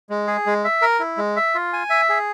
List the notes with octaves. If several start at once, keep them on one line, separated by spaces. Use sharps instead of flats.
G#3
G#4
G#3
E5
A#4
E4
G#3
E5
F4
G#5
E5
G#4